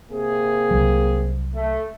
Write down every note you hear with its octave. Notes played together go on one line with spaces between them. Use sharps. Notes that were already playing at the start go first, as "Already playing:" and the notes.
C3 A#3 G#4
C2 F#3
A3